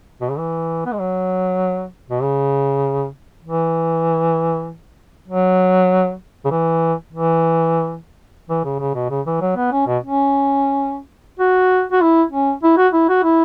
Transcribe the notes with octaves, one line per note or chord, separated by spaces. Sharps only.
B2
C#3
E3
B3
G#3
F#3
B2
C#3
E3
F#3
C#3
E3
E3
E3
C#3
C#3
B2
C#3
E3
F#3
B3
C#4
B2
C#4
F#4
F#4
E4
C#4
E4
F#4
E4
F#4
E4